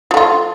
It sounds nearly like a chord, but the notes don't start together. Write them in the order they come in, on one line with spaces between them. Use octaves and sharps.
F3 A3 F4